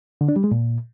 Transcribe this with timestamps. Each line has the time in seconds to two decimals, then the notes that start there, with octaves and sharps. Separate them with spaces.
0.21 D3
0.29 D4
0.36 G3
0.44 G#3
0.52 A#2